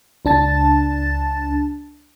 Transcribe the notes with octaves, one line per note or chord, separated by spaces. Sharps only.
C#2 D4 A5 A6